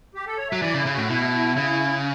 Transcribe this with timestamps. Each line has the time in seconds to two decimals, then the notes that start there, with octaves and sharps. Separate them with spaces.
0.15 G4
0.27 A4
0.38 C#5
0.50 F#3 E5
0.62 E3 D5
0.74 C#3
0.77 E4
0.86 C#3
0.94 A2 F#4
1.09 B2 E4
1.57 C#3